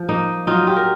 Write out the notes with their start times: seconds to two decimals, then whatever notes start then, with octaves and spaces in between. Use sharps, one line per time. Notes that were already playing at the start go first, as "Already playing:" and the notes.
Already playing: F3
0.09 A#3 D#4
0.47 F#3 D#4 F4
0.67 F4 G4
0.76 A#4